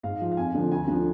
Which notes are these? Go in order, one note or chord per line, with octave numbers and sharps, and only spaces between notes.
G#2 F5
F3
F5
F2 G#5
D3 F3
D2 G#5
D3 F3